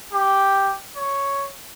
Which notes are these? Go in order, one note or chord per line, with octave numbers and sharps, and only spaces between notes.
G4
C#5